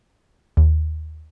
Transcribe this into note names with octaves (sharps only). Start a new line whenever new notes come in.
D#2